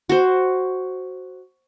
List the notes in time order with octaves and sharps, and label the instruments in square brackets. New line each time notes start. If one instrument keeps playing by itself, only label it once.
[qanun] F#4 C5